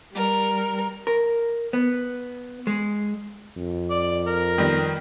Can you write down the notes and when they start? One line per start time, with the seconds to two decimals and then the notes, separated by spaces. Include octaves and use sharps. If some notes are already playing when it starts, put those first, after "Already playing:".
0.15 G3 A#4
1.07 A#4
1.73 B3
2.67 G#3
3.56 F2
3.90 D5
4.27 A#4
4.58 D#3 G3 B3